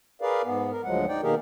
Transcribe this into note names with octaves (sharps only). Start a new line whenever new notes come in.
G#4 A#4 B4 D5 F5
G#2 B3
A#4
D2 F3 F#3 G#3 F#5
D#4 D5 G5
B2 D#3 A#3 G4 G#4 A#4